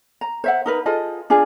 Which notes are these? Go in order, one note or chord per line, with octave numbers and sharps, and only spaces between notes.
A#5
C5 E5 F#5
D#4 A#4 B4
F4 G#4 A4 D#5
D4 F4 G#4